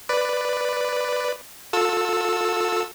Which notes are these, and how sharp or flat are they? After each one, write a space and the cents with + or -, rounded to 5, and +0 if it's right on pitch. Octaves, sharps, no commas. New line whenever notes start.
B4 +5 D5 +5
F4 +40 A4 +10 E6 -5